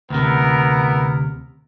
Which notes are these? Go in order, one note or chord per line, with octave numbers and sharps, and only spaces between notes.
D2 C3 B3 E4 A#4